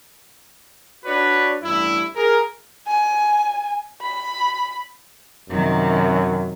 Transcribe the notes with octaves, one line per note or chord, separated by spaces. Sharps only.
D4 F#4 B4 C#5 D5
A1 G2 E4
G#4 A#4
G#5
B5
F#2 C3 D#3